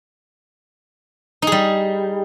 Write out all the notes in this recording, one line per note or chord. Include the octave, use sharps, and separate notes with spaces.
G3 D#4 G#4